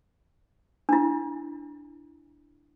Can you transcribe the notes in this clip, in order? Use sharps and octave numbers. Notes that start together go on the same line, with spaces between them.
D4 E4